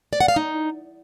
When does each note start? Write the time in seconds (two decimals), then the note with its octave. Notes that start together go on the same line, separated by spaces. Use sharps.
0.13 D5
0.20 F#5
0.28 F5
0.36 D#4